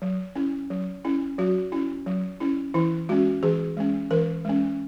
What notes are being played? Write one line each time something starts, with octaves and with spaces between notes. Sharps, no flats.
F#3
C#4 E4
F#3
C#4 E4
F#3 F#4
C#4 E4
F#3
C#4 E4
E3 E4
G#3 C#4 F#4
E3 G#4
G#3 C#4
E3 A#4
G#3 C#4